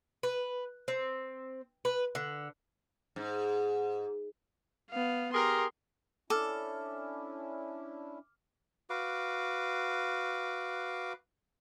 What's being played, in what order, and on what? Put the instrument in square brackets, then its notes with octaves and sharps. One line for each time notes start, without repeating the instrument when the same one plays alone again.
[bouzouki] B4
C4
B4
D3
[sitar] G#2
[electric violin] B3 F5
[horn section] G4 G#4 A#4 [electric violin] C6
[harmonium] C#4 D4 E4 [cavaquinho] A4 [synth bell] D6 F6
[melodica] F#4 B4 F5 D6